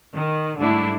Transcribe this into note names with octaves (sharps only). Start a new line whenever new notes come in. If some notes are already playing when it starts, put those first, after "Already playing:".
D#3
G#2 D3 G3 A3 D4 E4